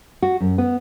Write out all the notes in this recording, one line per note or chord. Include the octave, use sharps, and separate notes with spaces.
F#4
F#2
B3